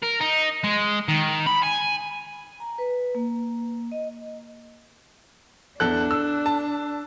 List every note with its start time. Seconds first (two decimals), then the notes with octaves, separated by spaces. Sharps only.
0.03 A#4
0.21 D#4
0.64 G#3
1.08 D#3
1.47 B5
1.63 G#5
2.60 A#5
2.78 B4
3.15 A#3
3.92 D#5
5.80 E2 D4 A4 F#6
6.11 E6
6.46 A5